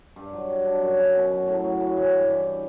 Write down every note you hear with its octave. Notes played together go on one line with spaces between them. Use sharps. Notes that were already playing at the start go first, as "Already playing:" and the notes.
G2
F#3
G3
D4
F#2
C#3
B2
F#3
A2
F#3
C#3
E3
G2
E3